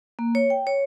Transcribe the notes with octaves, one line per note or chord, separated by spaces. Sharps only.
A#3
C#5
G5
C#5